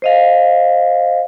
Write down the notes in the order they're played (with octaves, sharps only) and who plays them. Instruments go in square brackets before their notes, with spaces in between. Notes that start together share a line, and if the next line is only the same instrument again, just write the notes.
[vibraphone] C5 D#5 F5